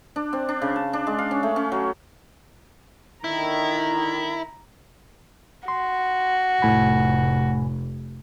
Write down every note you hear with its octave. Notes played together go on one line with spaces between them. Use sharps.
D4
C4
D4
C#3
A5
D4
G#3
F5
C#4
A3
C#4
F#3
A#2 D3 D#3 E4 A#5
F#4 C6
F1 A2 G#5 B5